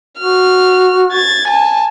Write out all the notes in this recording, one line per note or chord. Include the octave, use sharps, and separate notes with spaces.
F#4 F6
G#6 A6
G#5 A5